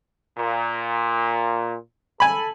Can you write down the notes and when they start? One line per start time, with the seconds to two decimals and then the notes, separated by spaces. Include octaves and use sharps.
0.38 A#2
2.20 A4 G#5 B5